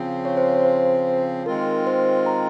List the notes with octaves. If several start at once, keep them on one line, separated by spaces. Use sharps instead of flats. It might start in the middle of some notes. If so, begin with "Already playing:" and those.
Already playing: C#3 F3 C4
C#5
C5
C#5
C5
D#3 G#3 C4 F4 A#4
C5
A#5